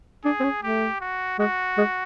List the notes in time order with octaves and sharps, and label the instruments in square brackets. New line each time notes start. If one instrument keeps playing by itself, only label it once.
[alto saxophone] D4 [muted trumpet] G#4
[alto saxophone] C4
C#4
[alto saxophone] A3 [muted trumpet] G4
[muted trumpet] F#4
[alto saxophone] G#3 [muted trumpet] F#4
[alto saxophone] G#3